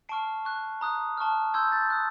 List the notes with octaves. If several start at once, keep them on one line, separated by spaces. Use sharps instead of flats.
A5 C#6 F6 C7 D7
C#6 F#6
A#5 D#6 F#6
A5 C#6 F6
C6 E6 G6 G#6
G6 A6
D#6 F#6